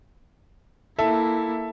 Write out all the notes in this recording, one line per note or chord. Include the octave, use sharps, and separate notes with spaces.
A#3 E4 A4 E5